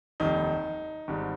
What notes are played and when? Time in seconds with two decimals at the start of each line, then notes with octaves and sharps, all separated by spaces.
0.20 F1 D#2 D#3 G3 D#4
1.08 G#1 G#2 G3